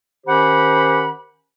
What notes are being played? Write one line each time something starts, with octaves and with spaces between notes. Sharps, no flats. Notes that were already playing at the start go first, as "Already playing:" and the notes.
D#3 C#4 G4 C5 F#5 B5